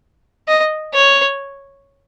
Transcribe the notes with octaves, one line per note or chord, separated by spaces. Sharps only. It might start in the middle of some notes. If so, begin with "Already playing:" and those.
D#5
C#5